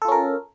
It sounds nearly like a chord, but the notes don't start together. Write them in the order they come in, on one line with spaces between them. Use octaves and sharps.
A4 F4 C#4 A#4